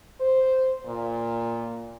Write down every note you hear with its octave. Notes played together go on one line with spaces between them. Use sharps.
C5
A#2